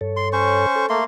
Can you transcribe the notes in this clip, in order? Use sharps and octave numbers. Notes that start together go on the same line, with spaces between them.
G2 A4 C#5
C6
C#4 C5 C#6
A4
A3 A#3 C6